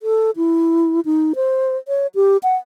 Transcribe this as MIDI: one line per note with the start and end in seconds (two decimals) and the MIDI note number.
0.03 0.31 69
0.37 1.00 64
1.05 1.33 63
1.36 1.77 72
1.88 2.07 73
2.15 2.37 67
2.43 2.56 78